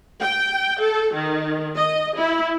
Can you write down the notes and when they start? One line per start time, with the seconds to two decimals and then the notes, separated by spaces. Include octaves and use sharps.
0.21 G5
0.81 A4
1.13 D#3
1.76 D#5
2.17 E4